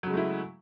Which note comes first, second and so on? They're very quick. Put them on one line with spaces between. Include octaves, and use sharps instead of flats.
F#3 C#3 G#3 A3 E4